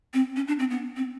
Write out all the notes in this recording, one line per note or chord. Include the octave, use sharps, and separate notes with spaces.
C4
C#4
D4
C4
B3
C4